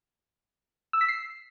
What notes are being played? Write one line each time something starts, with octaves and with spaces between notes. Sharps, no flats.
E6
B6
C7